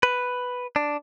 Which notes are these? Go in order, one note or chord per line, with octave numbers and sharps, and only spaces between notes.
B4
D4